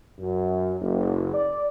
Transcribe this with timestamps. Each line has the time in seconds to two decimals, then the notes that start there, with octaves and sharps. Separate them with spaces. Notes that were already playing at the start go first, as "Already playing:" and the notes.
0.19 F#2
0.81 F#1
1.34 D5